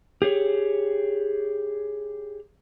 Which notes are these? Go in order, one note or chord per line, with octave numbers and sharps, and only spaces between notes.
G4 G#4 C#5